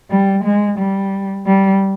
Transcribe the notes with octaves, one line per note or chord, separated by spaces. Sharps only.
G3
G#3
G3
G3